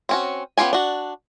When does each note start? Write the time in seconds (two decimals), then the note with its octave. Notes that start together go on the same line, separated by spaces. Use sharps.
0.09 C4 C#4 F#4
0.57 B3 C#4 F4 G4 G#5
0.73 D4 F#4